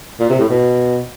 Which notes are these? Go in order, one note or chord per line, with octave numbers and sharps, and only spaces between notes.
A#2
C3
A2
B2